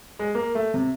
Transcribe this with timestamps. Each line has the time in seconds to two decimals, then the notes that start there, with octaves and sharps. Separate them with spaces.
0.19 G#3
0.35 A#3
0.55 A3
0.74 C3